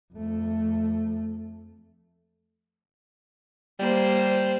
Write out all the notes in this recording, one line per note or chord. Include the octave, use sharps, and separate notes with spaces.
F2 A3
G3 A#3 C5